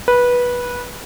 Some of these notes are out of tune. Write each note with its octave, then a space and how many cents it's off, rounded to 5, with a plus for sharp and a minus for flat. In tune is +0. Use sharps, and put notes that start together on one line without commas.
B4 -15